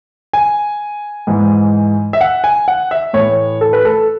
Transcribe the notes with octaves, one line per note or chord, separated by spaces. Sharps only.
G#5
G#2 E3
E5
F#5
G#5
F#5
E5
A2 E3 C#5
A4
B4
A4